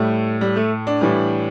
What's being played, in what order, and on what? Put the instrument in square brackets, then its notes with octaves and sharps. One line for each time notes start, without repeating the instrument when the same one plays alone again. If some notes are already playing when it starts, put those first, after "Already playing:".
Already playing: [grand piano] A2 G3 A3
G3
A3
D4
A2 E3 G3